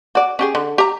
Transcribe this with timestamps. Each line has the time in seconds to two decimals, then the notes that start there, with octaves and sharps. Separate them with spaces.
0.15 F#4 D5
0.39 C#4 G4 G#4
0.55 D3
0.78 G4 A#5